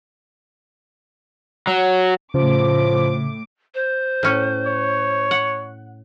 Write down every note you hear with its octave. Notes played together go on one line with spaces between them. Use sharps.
F#3
A2 C#3 F3 D6
C5
A2 C#4
C#5
F#5